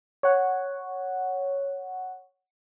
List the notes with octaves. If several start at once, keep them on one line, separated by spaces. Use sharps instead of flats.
C#5 F#5